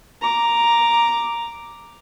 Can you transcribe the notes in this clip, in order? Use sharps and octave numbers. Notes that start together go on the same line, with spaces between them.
A#5 D6